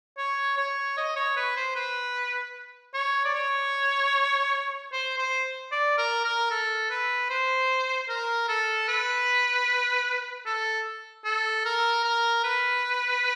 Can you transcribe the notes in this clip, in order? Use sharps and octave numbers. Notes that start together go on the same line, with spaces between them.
C#5
C#5
D#5
C#5
B4
C5
B4
C#5
D5
C#5
C5
C5
D5
A#4
A#4
A4
B4
C5
A#4
A4
B4
A4
A4
A#4
A#4
B4